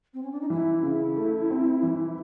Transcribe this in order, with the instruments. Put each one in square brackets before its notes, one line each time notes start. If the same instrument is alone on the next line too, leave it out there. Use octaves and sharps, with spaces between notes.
[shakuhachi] C4
C#4
D4
D#4
[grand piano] E3 [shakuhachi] E4
[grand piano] C#3
A3
C4
E3